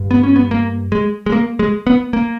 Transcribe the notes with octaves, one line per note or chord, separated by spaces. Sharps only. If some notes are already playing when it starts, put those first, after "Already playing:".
Already playing: G2
B3
C#4
B3
A#3
G#3
G#3
A#3
G#3
B3
A#3